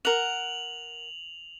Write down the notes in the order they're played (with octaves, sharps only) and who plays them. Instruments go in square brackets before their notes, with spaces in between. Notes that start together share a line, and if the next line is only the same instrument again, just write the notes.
[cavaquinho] A#4 F#5 [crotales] F7 F#7